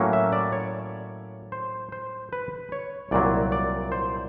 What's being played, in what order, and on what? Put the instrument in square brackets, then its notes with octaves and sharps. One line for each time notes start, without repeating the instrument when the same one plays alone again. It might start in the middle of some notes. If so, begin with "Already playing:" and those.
Already playing: [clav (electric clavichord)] A2 F#3 A#3 C#4
E5
D5
C#5
C5
C5
B4
C#5
C2 A#2 F#3 D5
D5
C5